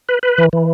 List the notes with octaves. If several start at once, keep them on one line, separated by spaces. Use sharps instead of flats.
B4
B4
E3
E3